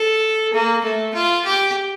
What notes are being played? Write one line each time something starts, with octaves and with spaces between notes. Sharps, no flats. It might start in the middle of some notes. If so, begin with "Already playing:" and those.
Already playing: A4
A#3
A3
F4
G4